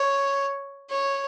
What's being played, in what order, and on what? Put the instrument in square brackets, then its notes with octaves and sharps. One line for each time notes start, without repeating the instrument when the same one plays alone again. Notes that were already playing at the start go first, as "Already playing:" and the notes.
Already playing: [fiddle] C#5
C#5